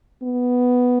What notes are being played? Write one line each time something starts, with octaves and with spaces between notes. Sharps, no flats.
B3